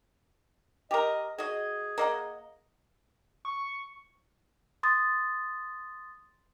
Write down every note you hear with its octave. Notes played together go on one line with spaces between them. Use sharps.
G4 A#4 D#5
F#4 G#4 D#5
A#3 D#5 F#5
C#6
C6 D#6 A6